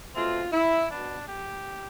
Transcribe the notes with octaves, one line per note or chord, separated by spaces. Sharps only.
B2 A3 C4 F4
E4
B2 B3 D4
G4